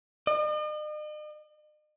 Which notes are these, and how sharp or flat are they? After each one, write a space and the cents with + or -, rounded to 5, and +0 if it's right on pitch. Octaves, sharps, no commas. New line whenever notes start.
D#5 -45